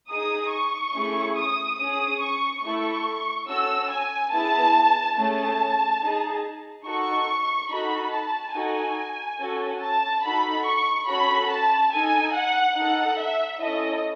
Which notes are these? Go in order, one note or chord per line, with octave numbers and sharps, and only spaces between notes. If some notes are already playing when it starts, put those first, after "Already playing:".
D#4 G#4 D#6
C#6
A3 C#4 E4 G#4
D#6
C#4 G#4 D#6
C#6
A3 E4 A4 C#6
C#4 F#4 A4 E6
G#5
B3 E4 G#4 A5
A3 C#4 G#4 A5
D#4 G#4
D#4 F#4 A4 C#6
D#4 F#4 A4 B5
A5
D#4 F#4 A4 G#5
C#4 F#4 A4
A5
D#4 F#4 A4 B5
C#6
C#4 F#4 A4 B5
A5
D#4 A4 G#5
F#5
D#4 A4 F#5
E5
C#4 E4 A4 D#5